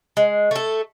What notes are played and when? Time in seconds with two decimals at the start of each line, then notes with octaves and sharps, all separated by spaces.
0.17 G#3
0.51 A3 A4